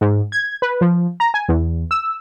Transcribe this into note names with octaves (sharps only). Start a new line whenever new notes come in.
G#2
G#6
B4
F3
A#5
G#5
E2
E6